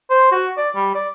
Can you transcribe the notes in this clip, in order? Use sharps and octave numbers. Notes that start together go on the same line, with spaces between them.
C5
F#4
D5
G3
D5